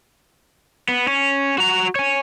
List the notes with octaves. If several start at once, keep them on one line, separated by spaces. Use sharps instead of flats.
B3
C#4
F#4 A#5
C#5 G#5